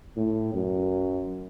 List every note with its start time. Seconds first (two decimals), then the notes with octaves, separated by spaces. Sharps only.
0.17 A2
0.54 F#2